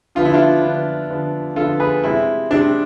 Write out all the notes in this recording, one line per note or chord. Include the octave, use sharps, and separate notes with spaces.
D3 F3 B3 F4
E4
D4 F4
D3 F3 B3
D3 F3 B3
D3 F3 B3 F4 A4
G#4 B4
C3 G#3 C4 E4
C3 G#3 C4 D4